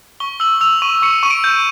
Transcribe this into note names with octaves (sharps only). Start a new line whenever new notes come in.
C#6 G7
E6 F#7
E6 F7
C#6 D#7
C#6 C#7
C#6 D#7
D7
G6